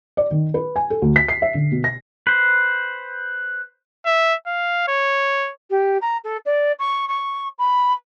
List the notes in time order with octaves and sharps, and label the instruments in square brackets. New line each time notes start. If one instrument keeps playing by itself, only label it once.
[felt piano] D5
D#3
B4
G#5
A4
D2
B6
C7
E5
D3
B2
A#6
[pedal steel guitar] B4 C5
[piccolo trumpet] E5
F5
C#5
[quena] G4
A#5
A4
D5
C#6
C#6
B5